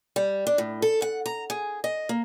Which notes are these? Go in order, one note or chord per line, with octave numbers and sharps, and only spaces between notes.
G3
D4
A2
A4
F#5
A#5
G#4
D#5
A#3